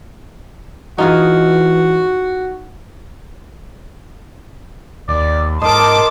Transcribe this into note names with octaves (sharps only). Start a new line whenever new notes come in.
E3 D#4 F4 F#4 G#4
D#2 D5
G#2 A#4 D#5 A5 C6 D6